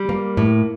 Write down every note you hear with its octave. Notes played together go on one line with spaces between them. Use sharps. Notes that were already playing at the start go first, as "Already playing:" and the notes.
Already playing: G3
A#3
A2